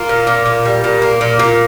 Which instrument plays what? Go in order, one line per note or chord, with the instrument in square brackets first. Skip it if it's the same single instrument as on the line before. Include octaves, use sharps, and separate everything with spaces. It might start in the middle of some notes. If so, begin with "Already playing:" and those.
Already playing: [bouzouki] A#3 F4
A#2
A#2
A#2
G3
A#2
A#3
A#2
A#2